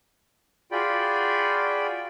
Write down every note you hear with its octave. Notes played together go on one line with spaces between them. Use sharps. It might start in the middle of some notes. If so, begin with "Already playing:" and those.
F4 F#4 G#4 D5 G5 B5